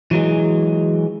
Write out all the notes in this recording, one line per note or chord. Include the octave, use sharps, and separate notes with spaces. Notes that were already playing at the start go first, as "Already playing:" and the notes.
E3 F#3 G#3